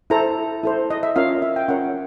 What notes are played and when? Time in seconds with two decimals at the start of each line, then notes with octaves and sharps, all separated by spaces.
0.10 E4 A4 C5 A#5
0.63 E4 A4 C5
0.91 D#5
1.03 E5
1.16 C#4 F4 A#4 C#5 F5
1.42 E5
1.56 G5
1.68 C#4 F4 A#4 C#5 F#5